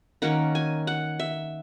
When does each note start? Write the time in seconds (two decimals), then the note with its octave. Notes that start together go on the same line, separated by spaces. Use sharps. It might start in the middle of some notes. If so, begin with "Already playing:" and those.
0.22 D#3 A#3 C#4 F#5
0.55 G#5
0.87 F#5
1.20 E5